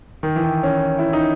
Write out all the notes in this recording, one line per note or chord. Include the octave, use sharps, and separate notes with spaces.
D#3
E3
D#3
C#4
E4
D#4